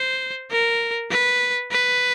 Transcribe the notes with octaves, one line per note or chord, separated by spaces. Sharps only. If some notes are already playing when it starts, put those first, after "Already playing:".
Already playing: C5
A#4
B4
B4